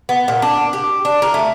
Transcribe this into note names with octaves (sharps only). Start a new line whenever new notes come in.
B3
A#2
D4
G4
D4
A#4
A3